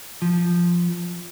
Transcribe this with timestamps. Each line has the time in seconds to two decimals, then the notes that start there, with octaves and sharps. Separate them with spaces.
0.22 F3